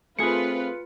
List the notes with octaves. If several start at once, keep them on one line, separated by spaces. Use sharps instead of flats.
A3 C4 F4 G#4 B4 C#7